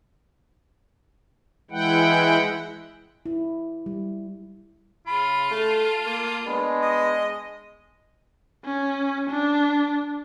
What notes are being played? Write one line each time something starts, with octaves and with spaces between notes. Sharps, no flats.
E3 G#3 E4 F#5 G5
E4
G3
C#3 F4 B5
A3 A5
A#3
G#3 B3 D4
D#5
C#4
D4